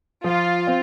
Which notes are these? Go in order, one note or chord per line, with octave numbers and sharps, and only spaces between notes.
F3 F4
C4